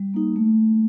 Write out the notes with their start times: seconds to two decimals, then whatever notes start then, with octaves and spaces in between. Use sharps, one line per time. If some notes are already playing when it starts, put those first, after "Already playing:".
Already playing: G3
0.14 A#3 D#4
0.36 A3